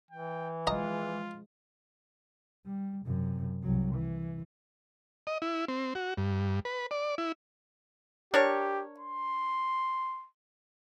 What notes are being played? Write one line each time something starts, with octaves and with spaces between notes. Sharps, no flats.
E3 G5
F3 G#3 F4 D#5 A#5
G3
F#2 C3
C2 F#3
E3
D#5
E4
C4
F#4
G2
B4
D5
E4
D4 G4 A#4 C#5
C6